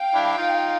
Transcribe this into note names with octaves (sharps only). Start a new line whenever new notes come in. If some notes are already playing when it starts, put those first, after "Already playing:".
Already playing: F5 G5
D4 E4
D#4 F4